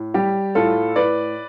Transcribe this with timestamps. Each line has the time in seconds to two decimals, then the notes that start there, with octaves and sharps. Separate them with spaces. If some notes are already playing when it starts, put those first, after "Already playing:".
Already playing: A2
0.14 G3 G4
0.55 A2 F4 A4
0.96 A2 B4 D5